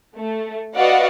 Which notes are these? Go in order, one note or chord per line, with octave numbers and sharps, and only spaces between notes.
A3
F#4 B4 D5 D#5 F5 F#5